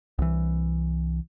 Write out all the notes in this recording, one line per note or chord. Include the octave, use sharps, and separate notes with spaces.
C2 E3